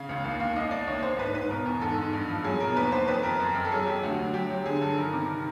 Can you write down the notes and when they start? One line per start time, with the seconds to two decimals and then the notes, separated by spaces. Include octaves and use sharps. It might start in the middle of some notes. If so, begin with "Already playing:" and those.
Already playing: C#3 F5
0.09 C#2
0.24 D#2 F5
0.40 D#2 F5
0.56 C2 D#5
0.71 C2 D5
0.87 D#2 C#5
1.03 D#2 C5
1.18 G#2 B4
1.35 G#2 B4
1.50 B2 A#4
1.65 E2
1.81 G#2 A4
1.98 G#2
2.13 G2
2.29 F3
2.44 F#3 G#4
2.60 B2 A#4
2.76 D#2 B4
2.92 D#2 C5
3.07 F2 B4
3.23 F2 A#4
3.40 F#2
3.55 F#2
3.64 A4
3.72 F#3 G#4
3.86 F#3 G4
4.03 D2 F#4
4.19 D2
4.34 F#3 G4
4.50 F#3
4.66 D3 G#4
4.81 G2 A4
4.97 D#3 A#4
5.12 C3